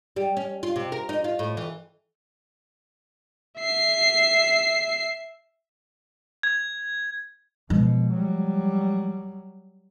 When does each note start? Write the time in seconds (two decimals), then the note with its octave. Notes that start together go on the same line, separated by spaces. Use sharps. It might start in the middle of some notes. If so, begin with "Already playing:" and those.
0.16 G3
0.37 C#4
0.63 F4
0.76 C3
0.92 A#4
1.09 D#4
1.24 F4
1.39 A2
1.57 E3
3.59 E5 C7
6.43 G#6
7.70 B2 F3 G#3
8.15 F#3 G3